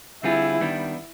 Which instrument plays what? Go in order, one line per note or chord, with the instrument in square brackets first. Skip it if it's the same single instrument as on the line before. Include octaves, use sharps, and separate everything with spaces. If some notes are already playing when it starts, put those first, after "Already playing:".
[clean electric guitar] D3 G3 C4 F4 G#4 [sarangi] E4
[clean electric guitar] D#3 G3 B3 D4